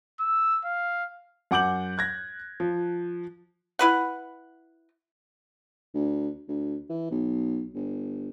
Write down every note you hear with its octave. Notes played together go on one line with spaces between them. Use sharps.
E6
F5
F#2 F#5 D6 G6 F#7
F#6 G#6 A#6
F3
E4 B4 F#5
D2
D2
E3
B1
G1